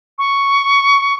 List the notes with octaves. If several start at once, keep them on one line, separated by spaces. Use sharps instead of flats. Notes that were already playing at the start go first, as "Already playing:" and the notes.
C#6